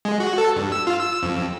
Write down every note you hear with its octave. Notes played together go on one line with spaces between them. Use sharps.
G#3
F#4
A4
G2
E6
F4
E6
F2